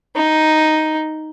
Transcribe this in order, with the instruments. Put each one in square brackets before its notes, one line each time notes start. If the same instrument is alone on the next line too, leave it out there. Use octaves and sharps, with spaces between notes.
[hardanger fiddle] D#4